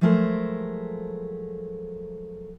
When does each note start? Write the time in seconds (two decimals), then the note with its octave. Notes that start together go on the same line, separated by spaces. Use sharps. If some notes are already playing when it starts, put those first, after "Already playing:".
0.01 F3 F#3 G#3 A3 A#4 C5